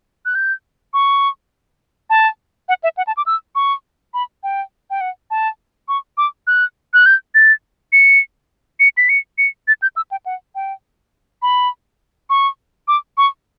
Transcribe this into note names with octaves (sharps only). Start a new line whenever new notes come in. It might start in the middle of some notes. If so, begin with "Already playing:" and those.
F#6
G6
C#6
A5
F#5
E5
F#5
A5
D6
E6
C#6
B5
G5
G5
F#5
A5
C#6
D6
F#6
F#6
G6
A6
C#7
C#7
B6
C#7
C#7
A6
G6
E6
G5
F#5
G5
B5
C#6
D6
C#6